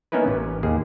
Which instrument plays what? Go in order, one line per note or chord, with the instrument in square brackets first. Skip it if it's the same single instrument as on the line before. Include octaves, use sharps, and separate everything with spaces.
[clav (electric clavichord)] A#3 B3 C#4 D#4 E4 B4
A1
D#2 A#3 G#4